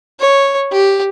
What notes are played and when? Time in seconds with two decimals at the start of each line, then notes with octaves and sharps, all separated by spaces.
0.20 C#5
0.72 G4